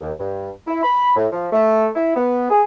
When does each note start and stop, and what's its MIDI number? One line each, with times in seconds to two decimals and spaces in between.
0.01 0.12 39
0.19 0.49 43
0.67 0.83 64
0.83 1.12 83
1.16 1.27 45
1.32 1.47 53
1.52 1.88 57
1.95 2.14 64
2.16 2.48 59
2.50 2.62 68